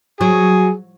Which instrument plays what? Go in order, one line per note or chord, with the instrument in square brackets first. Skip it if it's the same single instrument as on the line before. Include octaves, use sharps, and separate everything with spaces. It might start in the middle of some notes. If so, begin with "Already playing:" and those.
[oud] F#3 [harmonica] G#4